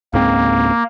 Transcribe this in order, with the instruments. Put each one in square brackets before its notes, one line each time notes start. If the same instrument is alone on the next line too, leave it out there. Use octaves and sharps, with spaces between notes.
[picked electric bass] C#2 G#2 C4 [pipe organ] A#3